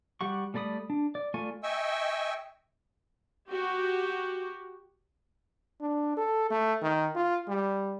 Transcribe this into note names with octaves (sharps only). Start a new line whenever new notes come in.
G3 G4 F#5 C#6
G3 A3 D5 B5 D#6
D4
D5
A3 F4 D5 G#5 C#6
D#5 E5 G5 G#5 C#6 E6
F#4 G4
D4
A4
A3
D#3
F4
G3